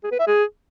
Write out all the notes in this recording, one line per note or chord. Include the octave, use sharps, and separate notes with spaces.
G#4
B4
E5
G#4